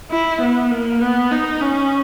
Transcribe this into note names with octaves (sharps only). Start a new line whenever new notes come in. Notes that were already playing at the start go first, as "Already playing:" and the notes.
E4
B3
A#3
B3
D#4
C#4